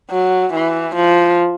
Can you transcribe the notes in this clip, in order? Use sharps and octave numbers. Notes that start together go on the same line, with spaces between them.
F#3
E3
F3